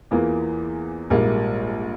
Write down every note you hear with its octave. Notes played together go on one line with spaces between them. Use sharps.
E2 E3 A#3 F4
A#1 G#2 G3 A#3